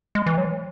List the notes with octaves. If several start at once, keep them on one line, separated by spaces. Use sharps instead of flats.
G#3
E3
F#3